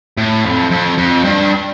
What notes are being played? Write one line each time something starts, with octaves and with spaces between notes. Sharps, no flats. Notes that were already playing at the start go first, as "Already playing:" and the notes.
A2
F2
F2
F2
G2